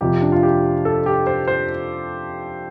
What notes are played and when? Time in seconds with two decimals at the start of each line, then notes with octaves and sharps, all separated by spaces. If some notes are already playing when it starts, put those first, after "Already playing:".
0.01 F2 C3 F3 G4
0.22 D4
0.32 F4
0.43 G4
0.85 A4
1.06 G4
1.27 C5
1.48 C5